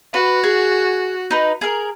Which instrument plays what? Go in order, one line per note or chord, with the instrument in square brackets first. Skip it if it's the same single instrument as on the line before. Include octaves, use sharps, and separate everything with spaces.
[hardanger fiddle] F#4 [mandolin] B4
[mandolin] G#4
D#4 B4
G#4 A#4